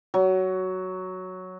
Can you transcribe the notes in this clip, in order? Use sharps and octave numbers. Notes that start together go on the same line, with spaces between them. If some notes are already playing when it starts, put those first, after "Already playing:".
F#3